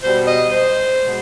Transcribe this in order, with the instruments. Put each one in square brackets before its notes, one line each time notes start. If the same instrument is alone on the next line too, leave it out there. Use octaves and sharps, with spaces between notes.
[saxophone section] B2 G3 C5
D#5
C5
B2 G#3